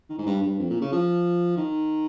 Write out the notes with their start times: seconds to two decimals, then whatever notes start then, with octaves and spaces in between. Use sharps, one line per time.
0.09 D#3
0.18 G#2
0.26 G2
0.42 G2
0.59 F2
0.70 A#2
0.81 C#3
0.92 F3
1.57 D#3